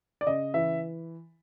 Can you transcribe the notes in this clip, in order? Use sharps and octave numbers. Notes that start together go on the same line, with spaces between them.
D5
C#3 D#5
E3 E5